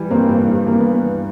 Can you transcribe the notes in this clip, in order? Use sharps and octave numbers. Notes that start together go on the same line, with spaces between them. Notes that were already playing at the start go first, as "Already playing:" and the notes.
Already playing: E3 G3
G2 A#3 C4
G2
G2
E3 A#3
B3